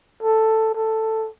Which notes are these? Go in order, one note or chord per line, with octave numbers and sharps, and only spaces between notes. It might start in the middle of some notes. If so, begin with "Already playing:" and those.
A4
A4